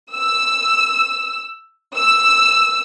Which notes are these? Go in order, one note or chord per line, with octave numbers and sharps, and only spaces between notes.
E6
E6